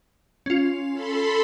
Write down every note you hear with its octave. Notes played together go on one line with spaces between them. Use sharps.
C#4 F4
A4 B5 C6